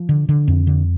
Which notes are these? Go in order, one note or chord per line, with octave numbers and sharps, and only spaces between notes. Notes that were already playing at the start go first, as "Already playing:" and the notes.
Already playing: F3
D3
D3
F2
D3